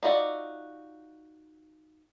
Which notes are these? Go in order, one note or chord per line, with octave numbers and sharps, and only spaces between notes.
D#4 F4 F#4 D5 E5